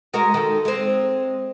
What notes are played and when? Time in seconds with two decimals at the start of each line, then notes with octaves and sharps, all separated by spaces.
0.14 G#3 F#4 A#4
0.34 D#3 A4
0.65 G#3 C4